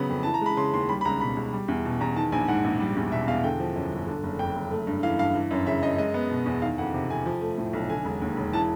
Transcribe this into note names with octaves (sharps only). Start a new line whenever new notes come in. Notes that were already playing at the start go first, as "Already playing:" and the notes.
Already playing: C#3 F#3 B3 B5
F2
E3 A5
A#5
G#3 B5
C#3 C6
D#2 C6
G3 B5
B5
C#2 A#5
B2 B5
C#2
G3
E2
B2
E2 A#5
D#3 A5
A#1 G#5
G#2 F#5
A#1
G3
E2
B2 E5
E2 F5
D3 G5
F3
F#2
G1
D3
F#1
F2 G5
F#1
A3
G2
E3 F5
G2 F5
E3
F#2
C#3 E5
F#2 D#5
G#3 D#5
B3
B2
E2
D#3 F5
F2 F#5
C3
F2 G#5
F3
A3
A2
B1
D3 G#5
E1
D#2
E1
E3 A5